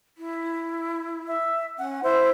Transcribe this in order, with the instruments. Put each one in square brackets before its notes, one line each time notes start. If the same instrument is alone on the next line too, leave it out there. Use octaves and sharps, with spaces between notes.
[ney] E4
[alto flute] E5
[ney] C#4 [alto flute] F#5
[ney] E4 [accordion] C5 [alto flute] E5